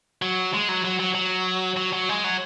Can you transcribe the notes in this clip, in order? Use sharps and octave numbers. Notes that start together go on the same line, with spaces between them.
F#3
G#3
F#3
F#3
F#3
F#3
F#3
F#3
G#3
F#3